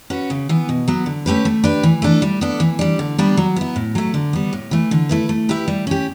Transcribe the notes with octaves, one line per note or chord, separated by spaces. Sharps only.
C#4 F#4 B4
C#3
E3 B3
B2
F#3 B3
D3
A3 C#4 G4 B4
A3
D4 G4 B4
E3
A3 D4 A4
G3
B3 D4 A4
E3
G3 D4
D3
G3 B3 D4
F#3
B3 E4
A2
F#3 A3
D3
G3 B3
A2
E3 A3
D3
A3 E4 B4
A3
E4 G4 B4
G3
C#4 G4